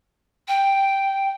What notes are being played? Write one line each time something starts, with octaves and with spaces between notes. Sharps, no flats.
G5